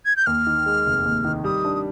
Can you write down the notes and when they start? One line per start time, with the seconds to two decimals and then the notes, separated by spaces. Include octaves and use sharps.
0.06 G#6
0.16 G6
0.26 D#2 F6
0.47 D#3
0.66 G#3
0.86 F1
1.05 D#2
1.25 D#3
1.44 G3 D#6
1.65 D4
1.74 D#6